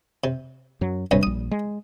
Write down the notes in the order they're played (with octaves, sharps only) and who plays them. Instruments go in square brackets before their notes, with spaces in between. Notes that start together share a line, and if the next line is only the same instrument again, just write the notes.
[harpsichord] C3
[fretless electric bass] F#2 F#3
[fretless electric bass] D#1 [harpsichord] G2 C3 C#4
[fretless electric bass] A#1 G3 [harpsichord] D#6
[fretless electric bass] G#3